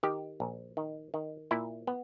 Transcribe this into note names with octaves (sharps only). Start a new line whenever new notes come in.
D#3 G4
A#1
D#3
D#3
A#2 E4
B3